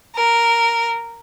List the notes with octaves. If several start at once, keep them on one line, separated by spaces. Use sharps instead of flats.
A#4